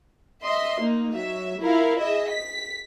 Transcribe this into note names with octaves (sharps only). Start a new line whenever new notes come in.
D#5 E5 C6
A#3 D#4
F#3 E5
E4 F4 A#4 F5
G#4 D#5 E5
B6